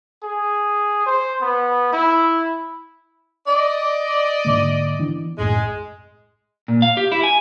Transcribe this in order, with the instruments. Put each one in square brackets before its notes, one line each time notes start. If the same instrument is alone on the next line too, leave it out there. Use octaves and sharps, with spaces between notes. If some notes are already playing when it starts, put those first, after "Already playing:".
[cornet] G#4
C5
B3
E4
[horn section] D5 D#5
[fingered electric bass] G#2 D3 A#3
E3 B3 D4
[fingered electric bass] B1 F#2 A2 [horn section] G#3
[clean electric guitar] A#2
F5
G4
E4
G#5